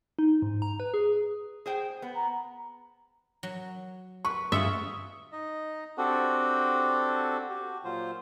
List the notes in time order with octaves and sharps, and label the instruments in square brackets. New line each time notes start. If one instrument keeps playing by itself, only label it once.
[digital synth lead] D#4
G#2
A#5
B4
G#4
[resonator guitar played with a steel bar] G#4 C5 G5
B3
[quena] A#5
[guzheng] F#3
[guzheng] B4 [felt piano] C#6
[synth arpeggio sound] G2 D#6 C#7 [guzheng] F4 G#4 F#5 [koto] E5
[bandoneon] D#4 D#5
C4 D4 F#4 G4 A4 F#5
F#4 G4
A#2 F#3 F4 C5